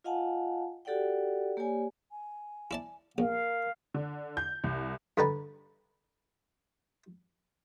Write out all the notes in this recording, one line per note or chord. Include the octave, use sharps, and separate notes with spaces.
F4 D#5 F5 F#5 G#5 A5
F#4 G4 A4 D5 F#5 G5
A#3 G4 C#5 D5 G#5
G#5
E4 D5 A5
A#1 A#4 F5
D3
G6
C2
G2 D3 G3 B4 D5 A#5